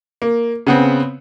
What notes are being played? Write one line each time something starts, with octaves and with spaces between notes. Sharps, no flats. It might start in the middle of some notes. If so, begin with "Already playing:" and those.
A#3
C#3 B3 C4